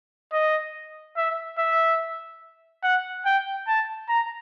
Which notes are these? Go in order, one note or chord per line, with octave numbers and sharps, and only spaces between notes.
D#5
E5
E5
F#5
G5
A5
A#5